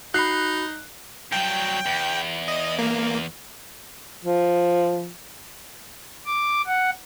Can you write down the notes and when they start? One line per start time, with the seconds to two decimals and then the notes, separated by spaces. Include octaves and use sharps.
0.14 D#4 F#4 B5 F#6 C7
1.32 G2 F#3 G5
1.86 E2
2.48 D#5
2.79 A#3
4.23 F3
6.26 D6
6.67 F#5